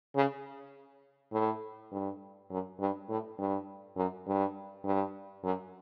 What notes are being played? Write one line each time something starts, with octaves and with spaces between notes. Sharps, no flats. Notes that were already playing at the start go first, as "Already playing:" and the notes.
C#3
A2
G2
F#2
G2
A2
G2
F#2
G2
G2
F#2